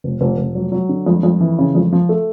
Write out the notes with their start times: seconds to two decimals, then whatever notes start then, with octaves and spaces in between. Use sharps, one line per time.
0.04 F1
0.21 F1
0.38 F1
0.55 F#3
0.72 F#3
0.89 D3
1.06 F2
1.23 F2
1.41 E3
1.58 C#3
1.75 F2
1.92 F3
2.09 A3